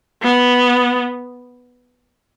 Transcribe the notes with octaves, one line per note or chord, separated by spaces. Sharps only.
B3